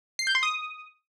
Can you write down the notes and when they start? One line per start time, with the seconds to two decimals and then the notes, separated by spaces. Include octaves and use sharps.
0.19 C7
0.27 G6
0.35 C6
0.43 D#6